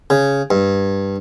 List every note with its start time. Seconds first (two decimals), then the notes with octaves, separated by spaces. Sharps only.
0.10 C#3
0.51 G2